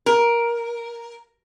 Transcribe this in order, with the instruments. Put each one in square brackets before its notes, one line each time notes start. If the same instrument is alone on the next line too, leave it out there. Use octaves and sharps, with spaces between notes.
[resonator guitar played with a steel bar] A#4